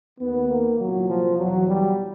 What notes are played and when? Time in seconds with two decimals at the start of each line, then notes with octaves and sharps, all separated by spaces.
0.19 D#2 D#3 B3
0.49 A#3
0.78 C2 A#2 F#3
1.08 F3
1.37 E2 B2 F#3
1.67 G3